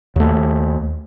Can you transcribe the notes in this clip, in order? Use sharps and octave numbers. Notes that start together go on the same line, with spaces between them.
D#2 A3